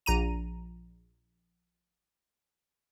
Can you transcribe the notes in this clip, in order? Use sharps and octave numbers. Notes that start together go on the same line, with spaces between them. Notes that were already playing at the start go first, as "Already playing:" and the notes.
A#1 A#5 D#7